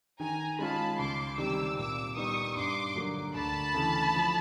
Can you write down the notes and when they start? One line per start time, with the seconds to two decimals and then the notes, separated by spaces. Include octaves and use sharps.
0.19 D#3 G#5 A#5
0.59 G#3 C#4 F4 A5 B5
0.98 C#2 C6 D6
1.37 C3 D#3 G3 D6 E6
1.77 A#2 D6 E6
2.16 G3 B3 D#4 C#6 D#6
2.56 G2 C6 D6
2.95 D3 F#3 A#3
3.34 D2 A5 B5
3.74 C#3 E3 A3
4.14 F3